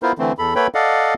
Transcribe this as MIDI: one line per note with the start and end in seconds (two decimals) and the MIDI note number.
0.03 0.12 59
0.03 0.12 64
0.03 0.12 65
0.03 0.12 70
0.03 0.12 72
0.18 0.32 50
0.18 0.32 52
0.18 0.32 57
0.18 0.32 60
0.38 0.54 40
0.38 0.54 69
0.38 0.54 83
0.55 0.67 58
0.55 0.67 69
0.55 0.67 71
0.55 0.67 73
0.55 0.67 79
0.55 0.67 83
0.75 1.14 69
0.75 1.14 74
0.75 1.14 75
0.75 1.14 77
0.75 1.14 78